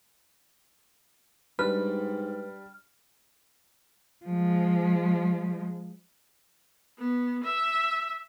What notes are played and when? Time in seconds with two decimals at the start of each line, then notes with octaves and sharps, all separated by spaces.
1.59 G#2 G3 D4 B4 F6
4.25 F3 G#3
6.98 B3
7.43 E5